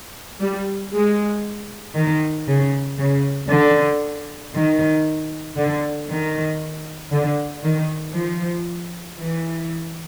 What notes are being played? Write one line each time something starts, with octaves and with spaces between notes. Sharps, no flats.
G3
G#3
D#3
C#3
C#3
D3
D#3
D3
D#3
D3
D#3
F3
E3